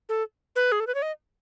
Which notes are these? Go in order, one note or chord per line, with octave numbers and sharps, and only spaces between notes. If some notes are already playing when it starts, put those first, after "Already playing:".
A4
B4
G#4
A4
B4
C#5
D#5